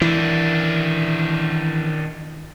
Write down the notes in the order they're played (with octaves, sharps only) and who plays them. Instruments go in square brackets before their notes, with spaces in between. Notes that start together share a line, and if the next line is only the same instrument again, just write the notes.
[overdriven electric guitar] D#3 D4 [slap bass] E3